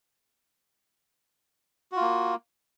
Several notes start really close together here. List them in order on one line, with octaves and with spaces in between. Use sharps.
F#4 F4 A#3